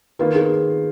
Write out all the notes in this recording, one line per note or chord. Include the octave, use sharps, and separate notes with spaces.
D#3 A#3 F4 B4
G#4